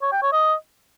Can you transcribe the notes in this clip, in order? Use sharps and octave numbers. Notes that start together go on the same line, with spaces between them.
C#5
G5
C#5
D#5